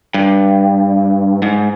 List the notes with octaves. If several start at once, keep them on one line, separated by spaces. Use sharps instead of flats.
G2
G#2